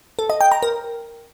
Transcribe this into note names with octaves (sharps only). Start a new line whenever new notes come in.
A4
D#5
G5
A#5
A#4